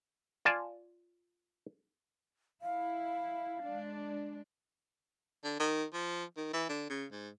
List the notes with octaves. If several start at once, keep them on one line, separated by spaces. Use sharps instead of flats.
F4 D5 G#5 A5
E4 F5
G#3 D4
D3
D#3
F3
D#3
E3
D3
C#3
G#2